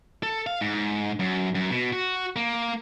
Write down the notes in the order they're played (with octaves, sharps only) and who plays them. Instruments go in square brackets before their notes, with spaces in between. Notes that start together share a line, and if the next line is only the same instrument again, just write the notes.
[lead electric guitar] A4
F5
G#2
F#2
F#2
B2
F#4
A#3